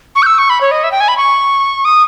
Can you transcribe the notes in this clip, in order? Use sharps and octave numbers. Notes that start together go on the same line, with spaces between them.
C#6
G6
E6
C#6
B5
C#5
D#5
E5
G5
G#5
B5
C#6
D#6